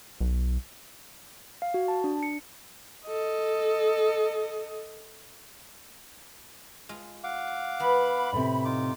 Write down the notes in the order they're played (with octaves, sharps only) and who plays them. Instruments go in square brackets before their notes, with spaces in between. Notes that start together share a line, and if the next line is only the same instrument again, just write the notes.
[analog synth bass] B1
[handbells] F5
F#4
A5
D4
C#7
[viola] A4 D#5
[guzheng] G#3 F4
[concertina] F5 F#5 D6
[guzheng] E3 B3 [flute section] B5
[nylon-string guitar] A2 C3
[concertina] D#4 F4 D6